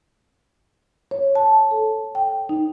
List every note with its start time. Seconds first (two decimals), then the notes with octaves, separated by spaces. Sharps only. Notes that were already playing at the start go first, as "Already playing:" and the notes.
1.11 C#5
1.35 A5
1.71 A4
2.15 G5
2.49 D#4